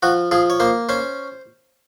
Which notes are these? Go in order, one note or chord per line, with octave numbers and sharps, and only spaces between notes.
F3 F#4
F3 G#4
C#5
A#3 C5
C#4 C5